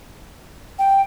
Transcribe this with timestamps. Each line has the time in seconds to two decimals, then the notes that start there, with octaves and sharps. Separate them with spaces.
0.79 G5